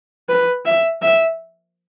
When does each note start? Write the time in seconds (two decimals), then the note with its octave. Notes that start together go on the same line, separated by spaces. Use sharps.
0.29 B4
0.65 E5
1.02 E5